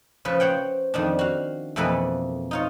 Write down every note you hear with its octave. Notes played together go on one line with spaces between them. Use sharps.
C#3 F3 B4
C5 C#5 F#5 G5
F2 D#3 D4
F#4 F5
F2 B2 E3 A#3 A4 B4
D#4 F4 C#5